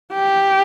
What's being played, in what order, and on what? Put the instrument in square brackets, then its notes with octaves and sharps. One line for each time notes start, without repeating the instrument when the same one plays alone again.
[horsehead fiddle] G4